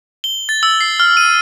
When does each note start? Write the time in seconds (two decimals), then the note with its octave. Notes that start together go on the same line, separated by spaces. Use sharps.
0.24 G7
0.49 A6
0.63 E6
0.81 C7
1.00 F6
1.17 D#7